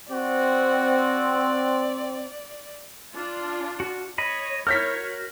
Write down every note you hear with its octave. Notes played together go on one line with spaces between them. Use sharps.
C4 F#4 D5
D4 F4
F#4
C#5 D#5 B5
E4 A#4 C#5 F6 G6 B6
F#4